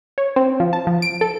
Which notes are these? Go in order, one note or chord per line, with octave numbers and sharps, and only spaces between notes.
C#5
C4
F3
A5
F3
D7
A4